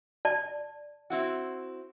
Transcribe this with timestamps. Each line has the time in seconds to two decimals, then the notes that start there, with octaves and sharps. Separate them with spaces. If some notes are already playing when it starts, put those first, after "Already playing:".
0.25 D5 A5
1.10 C4 E4 F#4